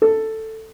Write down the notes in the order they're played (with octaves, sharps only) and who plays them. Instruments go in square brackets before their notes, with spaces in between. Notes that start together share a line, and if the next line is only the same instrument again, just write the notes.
[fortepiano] A4